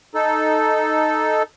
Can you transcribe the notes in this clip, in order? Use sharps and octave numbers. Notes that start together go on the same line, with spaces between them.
D#4 A4